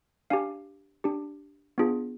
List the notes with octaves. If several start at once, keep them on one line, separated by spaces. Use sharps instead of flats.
D4 G4 F5 G#5
D4 G4
B3 D4 F4 G#4